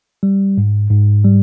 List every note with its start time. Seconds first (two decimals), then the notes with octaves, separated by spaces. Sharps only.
0.23 G3
0.58 G#2
0.91 G#2
1.24 G3